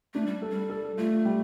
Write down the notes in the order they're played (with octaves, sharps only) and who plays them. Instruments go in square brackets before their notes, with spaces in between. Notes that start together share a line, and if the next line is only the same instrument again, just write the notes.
[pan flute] A3 [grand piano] D4
[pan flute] G3
[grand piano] A4
[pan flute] G3
[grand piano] A4
[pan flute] A3 [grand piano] F4
[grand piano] G3